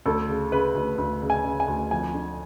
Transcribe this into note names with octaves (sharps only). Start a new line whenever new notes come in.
D2 A4
C#3
C#3 B4
D2
D2
C#3
G#5
C#3
G#5
D2
F2 G#5
D3